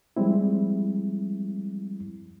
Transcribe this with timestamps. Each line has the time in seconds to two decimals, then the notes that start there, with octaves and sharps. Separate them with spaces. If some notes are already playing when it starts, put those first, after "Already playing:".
0.17 F3 G3 G#3 C4 E4